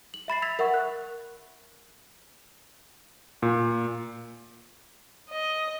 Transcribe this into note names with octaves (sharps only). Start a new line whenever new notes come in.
F#7
E5 B5 A6 C7
E6 G#6 A6 B6 F7
A#4 E5 F#5 C#6
F#6
A#2
D#5